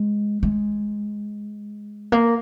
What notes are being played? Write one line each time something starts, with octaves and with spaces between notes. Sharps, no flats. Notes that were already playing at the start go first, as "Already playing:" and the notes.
Already playing: G#3
G#3
A#3